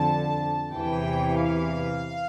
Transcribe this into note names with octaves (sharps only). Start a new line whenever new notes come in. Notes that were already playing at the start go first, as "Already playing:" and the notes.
Already playing: F2 D3 A5
E2 C3 E3 G5
F5